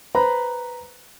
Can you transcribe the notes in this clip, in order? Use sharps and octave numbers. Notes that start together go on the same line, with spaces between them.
B4 C5 A#5 B5